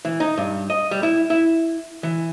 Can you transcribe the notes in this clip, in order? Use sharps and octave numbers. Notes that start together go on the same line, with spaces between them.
E3
D#4
G2
D#5
G3
E4
E4
E3